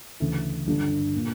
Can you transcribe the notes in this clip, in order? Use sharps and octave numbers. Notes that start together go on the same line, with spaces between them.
D2 C#3 E3
G1 G2 D3
A#2